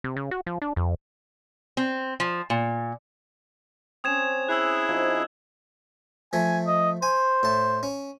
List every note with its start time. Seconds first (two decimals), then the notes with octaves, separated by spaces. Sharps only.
0.04 C3
0.16 C#3
0.31 F#4
0.46 F3
0.62 D4
0.76 F2
1.77 C4
2.20 F3
2.50 A#2
4.04 C4 C#4 D#6 G#6 E7
4.49 E4 G#4 E6 F#6
4.89 F3 D#4 D#5
6.33 F3 A3 G#5
6.67 D#5
7.02 C5 G#5
7.43 A2 A5
7.83 C#4